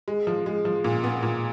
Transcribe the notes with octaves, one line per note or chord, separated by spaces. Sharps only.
G#3
F3
G#3
F3
A#2
B3
A#2